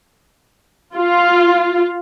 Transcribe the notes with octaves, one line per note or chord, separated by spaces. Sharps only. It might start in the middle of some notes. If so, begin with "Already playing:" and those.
F4